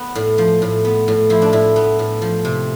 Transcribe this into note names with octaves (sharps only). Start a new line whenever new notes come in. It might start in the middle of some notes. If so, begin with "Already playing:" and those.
Already playing: B3
A2
F3
A2
B3
A2
F3 E4
D4
A2 E4
B3
A2
F3
C3